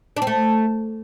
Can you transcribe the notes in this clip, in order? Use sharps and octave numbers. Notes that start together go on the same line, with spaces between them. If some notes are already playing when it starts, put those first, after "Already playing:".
D4
C4
A3